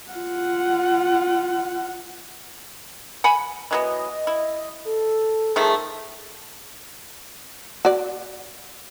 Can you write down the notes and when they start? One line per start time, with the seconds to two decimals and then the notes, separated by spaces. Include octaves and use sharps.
0.11 F4 F#5
3.24 F#5 G#5 B5
3.71 E3 F#3 B3 D#5
4.27 E4
4.85 A4
5.56 D#3 F3 A3 G#4
7.85 F#4 D5